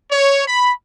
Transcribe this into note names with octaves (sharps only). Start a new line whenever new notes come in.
C#5
B5